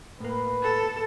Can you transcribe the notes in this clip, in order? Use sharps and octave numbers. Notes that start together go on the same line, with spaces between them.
A2 A#3 B4
A4